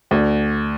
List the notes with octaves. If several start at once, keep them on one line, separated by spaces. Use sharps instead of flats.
D2